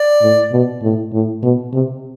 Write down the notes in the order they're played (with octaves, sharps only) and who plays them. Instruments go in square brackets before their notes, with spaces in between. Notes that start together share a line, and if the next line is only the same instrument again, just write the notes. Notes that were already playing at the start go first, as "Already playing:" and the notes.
Already playing: [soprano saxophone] D5
[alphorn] A2
B2
A2
A2
B2
C3